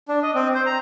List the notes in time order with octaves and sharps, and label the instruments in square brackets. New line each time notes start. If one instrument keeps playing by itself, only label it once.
[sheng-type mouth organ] D4
D#5
C4
C5
A#5